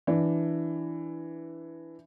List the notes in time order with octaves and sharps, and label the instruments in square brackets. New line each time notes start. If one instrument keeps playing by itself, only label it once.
[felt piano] E3 D4